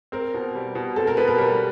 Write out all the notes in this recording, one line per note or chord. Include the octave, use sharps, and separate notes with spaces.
C4 A#4
B2
G3
B2
C4 A4
A#4
B2 B4
A#4
G3 A#4